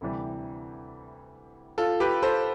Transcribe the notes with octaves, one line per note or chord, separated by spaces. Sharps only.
D2 C3 E3 G3
F4 A4
G4 B4
A4 C5